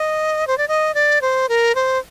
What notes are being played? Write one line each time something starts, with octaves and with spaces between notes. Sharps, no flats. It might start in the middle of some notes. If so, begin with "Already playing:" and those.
Already playing: D#5
C5
D5
D#5
D5
C5
A#4
C5